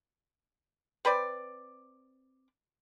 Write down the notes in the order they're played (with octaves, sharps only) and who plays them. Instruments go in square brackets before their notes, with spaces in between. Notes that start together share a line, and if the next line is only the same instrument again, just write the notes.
[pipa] C4 B4 C5 D5